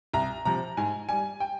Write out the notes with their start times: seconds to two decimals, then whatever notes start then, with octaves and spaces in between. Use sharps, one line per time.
0.14 C2 A#5
0.45 C3 F3 A#5
0.77 G#2 G#5
1.09 G3 G#5
1.40 G5